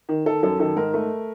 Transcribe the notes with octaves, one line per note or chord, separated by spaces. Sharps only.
D#3
D#3 A4
F#2 A4
D#3 A4
G#2 A#4
A3